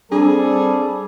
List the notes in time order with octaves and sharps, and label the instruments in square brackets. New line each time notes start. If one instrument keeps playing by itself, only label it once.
[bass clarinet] G3 [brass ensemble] C4 A4 [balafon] D4 [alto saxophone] G#4